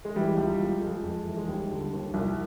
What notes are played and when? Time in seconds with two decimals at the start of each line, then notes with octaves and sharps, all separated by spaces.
0.05 G#3
0.16 E3 G3
0.37 C#2
0.60 C#2
0.81 F2 G#3
1.03 F2
1.26 E3
1.37 G#3
1.47 D#2 G3
1.71 D3
1.93 D#2
2.14 C2